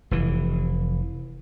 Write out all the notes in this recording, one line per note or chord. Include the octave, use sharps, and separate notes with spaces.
F1 E3